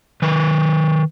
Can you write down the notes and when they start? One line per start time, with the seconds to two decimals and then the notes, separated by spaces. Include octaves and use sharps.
0.22 D#3 B4